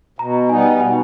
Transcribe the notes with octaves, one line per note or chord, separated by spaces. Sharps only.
B2 A#5
G3 B3 D#4 G#5
B2 F#5